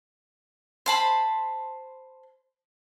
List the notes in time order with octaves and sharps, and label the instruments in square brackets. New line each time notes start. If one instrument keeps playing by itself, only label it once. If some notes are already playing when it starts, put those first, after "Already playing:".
[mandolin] C5 A5 B5